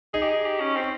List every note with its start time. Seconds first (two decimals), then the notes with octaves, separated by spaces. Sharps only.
0.14 D#4 G#4
0.23 G4
0.29 G#4
0.46 G4
0.60 C#4
0.76 C4